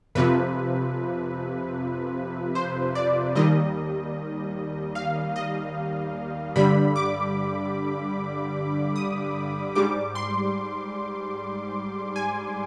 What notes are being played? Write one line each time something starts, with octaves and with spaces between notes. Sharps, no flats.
F2 C3 F3 B4
C5
D5
D#2 D#3 G3 D#5
F5
D#5
G2 D3 G3 B5
D6
D#6
G#2 G3 D6
C6
G#5